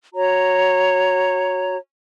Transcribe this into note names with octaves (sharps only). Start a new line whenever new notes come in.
F#4 C#5 A#5